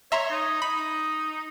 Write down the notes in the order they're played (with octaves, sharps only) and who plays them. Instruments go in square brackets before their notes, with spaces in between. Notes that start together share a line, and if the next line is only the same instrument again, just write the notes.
[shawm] C#5 [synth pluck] E5 A#5 C6
[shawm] D#4
[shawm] D#4 [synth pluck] B5